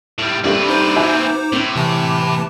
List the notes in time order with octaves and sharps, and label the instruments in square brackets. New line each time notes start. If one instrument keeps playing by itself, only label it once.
[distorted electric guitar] A2 G3
[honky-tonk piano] G2 A3 [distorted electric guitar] C4 B4 [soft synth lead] D6
[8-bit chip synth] D#4 C5
[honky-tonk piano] F#4 E5 G#5
[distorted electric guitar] A2 [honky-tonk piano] C4
[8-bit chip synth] C3 E3 A5